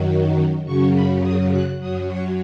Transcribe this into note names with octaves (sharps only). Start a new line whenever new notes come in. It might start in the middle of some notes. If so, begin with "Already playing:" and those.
Already playing: F#2 D#3 F#3
F#2 C#3 F#3 C#6
B5
D#6
F#6
F#2 F#3 D#6
C#5